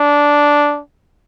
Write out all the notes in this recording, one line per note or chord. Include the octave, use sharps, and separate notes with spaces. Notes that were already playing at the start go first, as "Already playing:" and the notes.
Already playing: D4